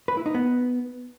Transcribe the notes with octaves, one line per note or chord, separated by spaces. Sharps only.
B4
E4
D#4
B3